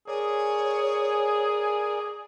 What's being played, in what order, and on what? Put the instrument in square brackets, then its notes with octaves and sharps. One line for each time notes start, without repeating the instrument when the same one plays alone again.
[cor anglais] G#4 [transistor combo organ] A#4 D5 G#5 [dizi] C#5